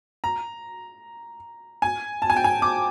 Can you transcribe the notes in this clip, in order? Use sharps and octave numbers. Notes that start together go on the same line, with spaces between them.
A#5
G#5
A5
G#5
G5
G#5
D6